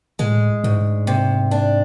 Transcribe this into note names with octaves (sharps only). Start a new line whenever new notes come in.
A2 G#3
D2 G#2
C3
D4